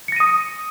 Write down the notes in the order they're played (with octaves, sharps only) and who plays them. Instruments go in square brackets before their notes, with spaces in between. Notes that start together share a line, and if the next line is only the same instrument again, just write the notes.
[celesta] C#7
A#6
D#7
D#6